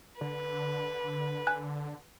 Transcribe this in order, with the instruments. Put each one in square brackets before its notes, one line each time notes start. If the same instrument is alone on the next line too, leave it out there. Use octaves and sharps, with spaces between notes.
[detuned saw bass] D3 [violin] B4
[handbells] G#5 F#6